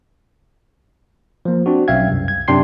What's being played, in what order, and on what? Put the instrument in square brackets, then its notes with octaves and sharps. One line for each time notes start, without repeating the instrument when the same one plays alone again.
[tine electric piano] F3 A#3
C4 D4 F#4
B1 C#4 E5 F5 G5 G#6
C2 F#2
G#6
F#2 C3 D4 G5 C6 C7